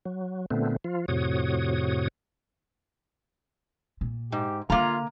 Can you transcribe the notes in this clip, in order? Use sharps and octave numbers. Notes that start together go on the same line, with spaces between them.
F#3
A#2 D3 A3 B3 C4
F3 F4
F2 A2 C3 F#4 C#5 D#6
A#2
G#2 G4
D3 A#3 D4 F4 A#5